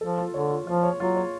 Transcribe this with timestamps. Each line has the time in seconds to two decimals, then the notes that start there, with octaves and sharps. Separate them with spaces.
0.01 F3 A4
0.18 F4
0.34 D3 C#5
0.50 F4
0.67 F3 F4
0.83 C#5
1.00 F#3 F4
1.16 C#5